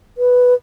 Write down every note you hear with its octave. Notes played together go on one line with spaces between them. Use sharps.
B4